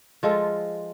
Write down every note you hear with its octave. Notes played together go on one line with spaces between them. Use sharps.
F3 G#3 F4 A4